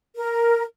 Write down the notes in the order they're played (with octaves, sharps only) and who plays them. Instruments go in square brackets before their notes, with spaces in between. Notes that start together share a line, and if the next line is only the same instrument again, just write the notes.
[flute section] A#4